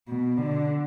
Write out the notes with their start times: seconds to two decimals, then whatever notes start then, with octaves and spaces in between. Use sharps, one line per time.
0.08 B2
0.38 D3